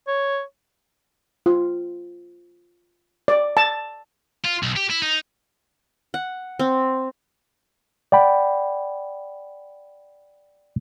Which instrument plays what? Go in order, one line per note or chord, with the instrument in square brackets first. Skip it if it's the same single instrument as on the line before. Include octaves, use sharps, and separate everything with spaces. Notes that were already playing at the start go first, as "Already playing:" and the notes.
[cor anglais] C#5
[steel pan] F4
D5
A5
[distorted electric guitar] F4
B1
G4
E4
D#4
[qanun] F#5
C4
[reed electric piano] D5 F#5 G5 B5